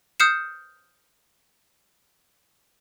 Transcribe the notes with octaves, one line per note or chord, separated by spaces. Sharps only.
D#6 F6 G6 C7 C#7 E7